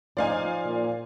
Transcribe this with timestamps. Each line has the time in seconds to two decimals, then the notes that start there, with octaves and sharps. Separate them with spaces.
0.17 F3 D#4 D5 F5 G#5
0.65 A#2